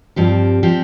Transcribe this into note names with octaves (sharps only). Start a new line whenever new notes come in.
G2 F3 C4 G4
F3 C4 G4